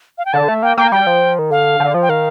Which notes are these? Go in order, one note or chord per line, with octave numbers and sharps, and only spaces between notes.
F5
G5
D3 A5
A3
A#3 G5
A#3 G5
G3 G5
F3
D#3
D3 F5
D3
F3
G5
D#3 F5